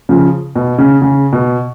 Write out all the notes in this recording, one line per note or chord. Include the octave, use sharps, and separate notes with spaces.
C#3 F3
B2
C#3
C#3
B2